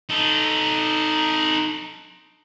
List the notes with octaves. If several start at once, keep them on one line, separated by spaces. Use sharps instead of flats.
D#4 A4